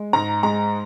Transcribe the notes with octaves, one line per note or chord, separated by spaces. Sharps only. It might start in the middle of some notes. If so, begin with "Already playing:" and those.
Already playing: G#3
G#2 A#5
G#3 A#5